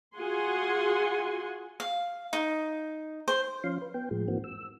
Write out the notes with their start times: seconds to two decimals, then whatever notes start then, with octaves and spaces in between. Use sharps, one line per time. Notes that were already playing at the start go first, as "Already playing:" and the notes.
0.19 F4 F#4 G#4 F#5 G#5 C6
1.80 F5
2.33 D#4
3.28 C5
3.64 F3 C#4 F5 C6
3.82 B4
3.94 B3 G5
4.11 A2 F3 G#3
4.28 G#2 E3 A#3 C4 F#4
4.44 E6